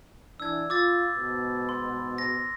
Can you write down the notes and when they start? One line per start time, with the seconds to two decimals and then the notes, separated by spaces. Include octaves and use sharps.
0.40 E3 D4 E6 G#6
0.70 F4 D6 E6 A6
1.16 G#2 B2
1.69 C6
2.18 A#6